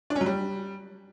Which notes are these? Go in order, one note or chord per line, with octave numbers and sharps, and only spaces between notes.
D4
C#4
F#3
G3